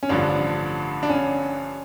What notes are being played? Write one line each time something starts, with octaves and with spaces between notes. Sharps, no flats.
C#4
A1 G2 D3 F3 D4
D4
C#4